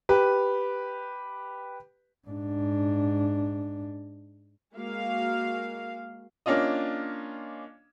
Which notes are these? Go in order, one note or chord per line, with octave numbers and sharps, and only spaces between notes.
G4 B4
G#2 D4
G#3 A#3 F#4 F5
A#3 C#4 D4 F4 D#5